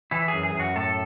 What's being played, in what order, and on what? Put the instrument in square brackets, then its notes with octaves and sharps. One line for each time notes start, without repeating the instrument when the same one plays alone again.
[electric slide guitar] E3 E4
G#4
F#2
G#4
F#2
F#4
A2 A4